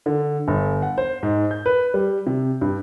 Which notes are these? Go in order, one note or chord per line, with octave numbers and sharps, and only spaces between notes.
D3
G1
F#5
C5
G#2
G6
B4
G3
C3
G2